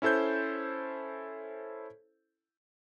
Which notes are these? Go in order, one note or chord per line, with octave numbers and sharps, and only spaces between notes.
C#4 E4 A4 C5 G6